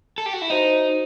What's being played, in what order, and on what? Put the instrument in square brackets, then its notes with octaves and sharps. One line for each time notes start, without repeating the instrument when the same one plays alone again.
[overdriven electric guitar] A4
G4
F#4
E4
[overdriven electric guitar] D#4 [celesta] F#4 C5 D#5